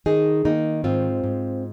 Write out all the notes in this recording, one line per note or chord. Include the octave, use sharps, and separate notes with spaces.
D#3 D#4 G#4
D#3 A#3 D#4
G#2 C4 F4
G#2